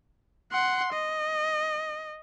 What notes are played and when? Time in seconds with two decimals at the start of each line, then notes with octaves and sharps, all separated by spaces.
0.52 F#5 C6
0.93 D#5